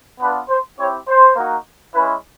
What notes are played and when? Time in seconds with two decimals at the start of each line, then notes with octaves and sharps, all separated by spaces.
0.20 B3 D4 F4 B4
0.49 C5
0.79 C4 E4 G4 C#5
1.08 C5
1.36 A#3 D#4 F#4
1.94 G#3 C#4 E4 B4